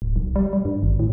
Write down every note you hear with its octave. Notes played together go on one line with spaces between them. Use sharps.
D1
B1
G3
G3
G2
G#1
A2